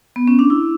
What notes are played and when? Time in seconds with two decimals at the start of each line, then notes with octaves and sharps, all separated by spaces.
0.16 B3
0.28 C#4
0.39 D4
0.50 E4